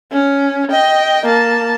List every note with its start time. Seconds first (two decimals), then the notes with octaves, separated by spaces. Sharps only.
0.12 C#4
0.71 D#5 G5
1.26 A#3 A5